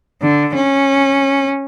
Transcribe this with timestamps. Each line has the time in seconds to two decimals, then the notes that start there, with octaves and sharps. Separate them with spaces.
0.22 D3
0.55 C#4